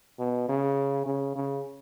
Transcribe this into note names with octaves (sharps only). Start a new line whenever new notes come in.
B2
C#3
C#3
C#3